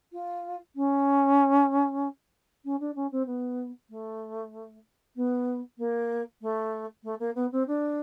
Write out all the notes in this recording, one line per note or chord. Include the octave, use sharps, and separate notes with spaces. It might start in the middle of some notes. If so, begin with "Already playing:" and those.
F4
C#4
C#4
D4
C#4
C4
B3
A3
B3
A#3
A3
A3
A#3
B3
C4
D4